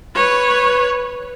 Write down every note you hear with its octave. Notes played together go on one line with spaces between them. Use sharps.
B4 C#5